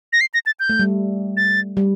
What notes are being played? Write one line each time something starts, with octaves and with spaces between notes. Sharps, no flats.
A#6
C7
A#6
A6
G6
A3
G3
A6
G3